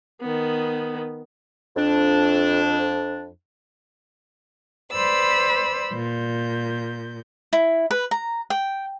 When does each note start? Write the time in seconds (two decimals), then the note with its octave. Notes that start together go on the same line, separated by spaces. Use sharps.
0.21 D#3 B3
1.76 F2 D4
4.91 B4 C5 D5 B5 E6
5.92 A#2 G6
7.53 E4
7.91 B4
8.11 A#5
8.50 G5